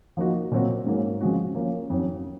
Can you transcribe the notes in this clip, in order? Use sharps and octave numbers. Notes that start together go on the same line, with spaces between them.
F3 A#3 D#4 F#4
A#2 F#3 C4 F#4
G#2 F#3 A#3
C#3 F3 G#3 C4 F#4
F3 A#3 C#4 F4
F2 D#3 F#3 C#4